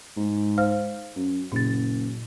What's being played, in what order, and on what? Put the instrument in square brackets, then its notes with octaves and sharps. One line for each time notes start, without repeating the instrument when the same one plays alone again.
[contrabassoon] G#2
[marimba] C5 F5 F6
[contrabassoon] F#2
[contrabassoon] F#1 [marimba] A#2 A6